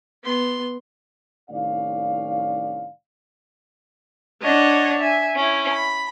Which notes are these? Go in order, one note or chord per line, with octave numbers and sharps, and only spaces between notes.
B3 C6
C2 A2 D#3 C#4 D5 F5
D4 C#5 D#5 F#5
E5 G#5
C#4 E4
B5